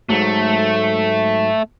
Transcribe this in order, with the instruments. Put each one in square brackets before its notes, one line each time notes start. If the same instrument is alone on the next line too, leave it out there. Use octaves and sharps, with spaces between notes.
[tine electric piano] G#2 F#3 [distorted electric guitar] A3